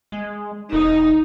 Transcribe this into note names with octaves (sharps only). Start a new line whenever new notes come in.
G#3
E1 D#4